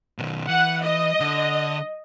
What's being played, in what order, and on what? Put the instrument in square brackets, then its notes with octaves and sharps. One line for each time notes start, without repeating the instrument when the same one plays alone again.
[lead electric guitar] B2 D#3
[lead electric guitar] E3 [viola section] F#5
[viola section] D#5
[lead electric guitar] D3